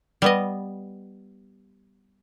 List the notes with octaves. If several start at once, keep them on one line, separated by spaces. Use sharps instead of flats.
G3 B3 D#5